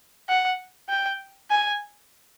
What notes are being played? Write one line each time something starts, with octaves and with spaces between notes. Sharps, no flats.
F#5
G5
G#5